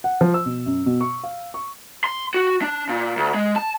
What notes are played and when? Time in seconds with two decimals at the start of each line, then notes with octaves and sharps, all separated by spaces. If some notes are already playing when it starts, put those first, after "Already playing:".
0.04 F#5
0.21 F3
0.34 E6
0.46 B2
0.66 F#2
0.86 B2
1.01 C#6
1.24 F5
1.54 C#6
2.04 C6
2.34 F#4
2.62 D4
2.89 A#2
3.17 D2
3.34 G#3
3.56 A5